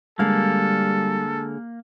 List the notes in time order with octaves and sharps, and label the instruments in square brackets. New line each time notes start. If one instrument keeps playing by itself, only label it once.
[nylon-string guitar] D3 G#3 F5 [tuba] G3 [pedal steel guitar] A#3 [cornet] A4